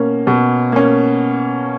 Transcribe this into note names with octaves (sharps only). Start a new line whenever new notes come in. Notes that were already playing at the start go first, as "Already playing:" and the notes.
Already playing: B2 A#3 C#4
B2
A#3 C#4